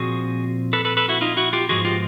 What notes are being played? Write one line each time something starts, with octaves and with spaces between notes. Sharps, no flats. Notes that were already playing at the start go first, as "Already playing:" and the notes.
Already playing: A#2 F3 C4 F#4 G#4
A4 B4
A4 B4
A4 B4
E4 F#4
D#4 F4
E4 F#4
F4 G4
G#2 F3 G#3 B3 F#4 G#4
F4 G4